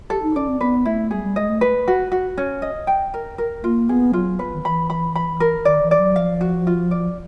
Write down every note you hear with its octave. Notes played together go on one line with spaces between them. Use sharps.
G4 A4
D#4
C#4 D5
C4
B3 B4
A3 E4
G3 G#4
G3
G#3 D#5
A3
B4
F#4
F#4
C#4
D#5
G5
A#4
A#4
A#3 F4
B3 G#4
F#3 F4
B4
D#3
E3 B5
B5
B5
A#4
D#3 D5
E3
D5
F#3
F3 F5
F#4
F4
D5